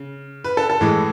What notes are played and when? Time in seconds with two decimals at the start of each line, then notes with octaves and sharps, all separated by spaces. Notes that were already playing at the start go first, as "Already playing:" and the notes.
Already playing: C#3
0.44 B4
0.57 A4
0.70 A4
0.81 A2 E3 G#3